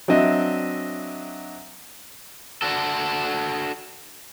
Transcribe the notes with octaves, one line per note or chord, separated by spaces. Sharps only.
F#3 C4 D4 D#5 E5
D4 F#4 A4